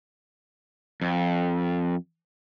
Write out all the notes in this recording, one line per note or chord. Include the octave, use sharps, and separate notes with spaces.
F2